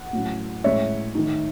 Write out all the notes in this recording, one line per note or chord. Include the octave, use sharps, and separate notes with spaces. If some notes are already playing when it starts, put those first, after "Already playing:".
Already playing: F#5
A2 F#3 C#4
A2 G#3 C#4 C#5 E5
D#3 A3 D#4